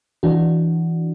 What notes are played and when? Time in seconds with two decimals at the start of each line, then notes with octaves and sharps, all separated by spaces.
0.23 E3 D4 F#4